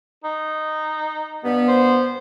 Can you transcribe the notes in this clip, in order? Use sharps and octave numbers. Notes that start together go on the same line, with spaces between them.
D#4
G2 B3
C5